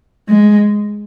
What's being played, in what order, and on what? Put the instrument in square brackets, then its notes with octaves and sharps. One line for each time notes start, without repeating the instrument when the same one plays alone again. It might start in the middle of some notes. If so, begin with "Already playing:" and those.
[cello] G#3